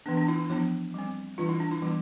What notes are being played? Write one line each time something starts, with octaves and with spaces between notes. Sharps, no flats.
E3 B3 D4
D4
E4
E4
F3 B3 D4 E4
G3 C4
E3 G3 D4 F4
E4
D4
E4
E3 G3 B3 D4 E4